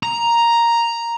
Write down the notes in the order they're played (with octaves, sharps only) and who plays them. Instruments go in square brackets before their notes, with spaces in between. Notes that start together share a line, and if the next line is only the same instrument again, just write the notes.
[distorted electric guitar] A#5